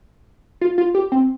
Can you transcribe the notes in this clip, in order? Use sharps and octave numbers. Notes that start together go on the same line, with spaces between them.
F4
F4
G4
C4